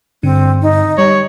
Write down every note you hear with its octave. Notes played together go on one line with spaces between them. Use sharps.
G2 D3 C4
D#4
G3 C#5